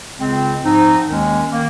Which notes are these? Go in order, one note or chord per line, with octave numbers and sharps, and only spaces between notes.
C#2 C#3 G#3 C4
G#2 F3 C4 D#4
D#2 D#3 G#3 C#4
D#3 A#3